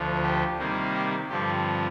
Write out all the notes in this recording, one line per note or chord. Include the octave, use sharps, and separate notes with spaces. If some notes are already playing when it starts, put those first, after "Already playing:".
Already playing: D2 D3 F3
G4
C3 D#3 G3 A#3
G4
G2 D3 F3 C4 G4